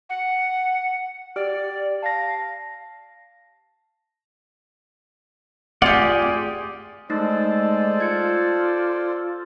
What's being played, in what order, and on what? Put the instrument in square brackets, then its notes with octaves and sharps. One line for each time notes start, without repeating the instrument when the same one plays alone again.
[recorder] F#5
[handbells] G4 F6 D7 [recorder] D5
[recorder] F5 [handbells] A5 A#6
[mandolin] F4 G4 [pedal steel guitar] G#4 D5 [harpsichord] F#5
[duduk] G#3 [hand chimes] A3 D#4 [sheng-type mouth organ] A4 C5 D5
[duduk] F4 [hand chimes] G#6 C#7